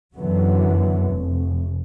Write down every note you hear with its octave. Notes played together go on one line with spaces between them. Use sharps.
F#2 D3 E3 F#3 B3
F1